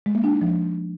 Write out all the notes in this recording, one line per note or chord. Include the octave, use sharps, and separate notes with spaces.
G#3
A#3
D4
D#4
F3